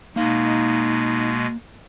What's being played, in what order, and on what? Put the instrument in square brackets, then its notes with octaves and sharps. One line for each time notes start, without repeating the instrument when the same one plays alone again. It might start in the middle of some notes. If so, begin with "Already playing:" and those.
[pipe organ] B2 G#3 [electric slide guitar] A#3 F5 [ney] D#4